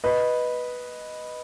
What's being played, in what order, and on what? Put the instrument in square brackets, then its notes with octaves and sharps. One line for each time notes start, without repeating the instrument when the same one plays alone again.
[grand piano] B4 D#5